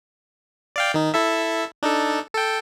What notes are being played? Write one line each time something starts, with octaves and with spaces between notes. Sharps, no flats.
D5 F5 G5
D#3 D#4
E4 A4 E5
D4 D#4 A4
A4 G5